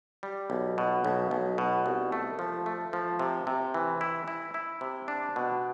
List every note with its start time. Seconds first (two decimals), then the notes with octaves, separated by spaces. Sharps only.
0.23 G3
0.50 B1
0.78 B2
1.04 B1
1.31 B1
1.58 B2
1.86 C2
2.12 A3
2.39 F3
2.66 A3
2.93 F3
3.19 C3
3.47 C3
3.74 E3
4.01 E4
4.28 E4
4.54 E4
4.81 C3
5.08 D4
5.36 B2